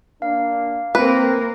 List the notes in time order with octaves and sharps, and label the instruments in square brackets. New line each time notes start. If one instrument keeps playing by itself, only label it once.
[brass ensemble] A#3 D4 [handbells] F5
[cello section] A#3 A#4 [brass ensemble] C4 [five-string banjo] B4